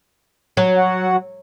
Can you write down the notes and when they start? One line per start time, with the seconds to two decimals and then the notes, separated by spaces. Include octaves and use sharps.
0.57 F#3
0.77 F#4 F#5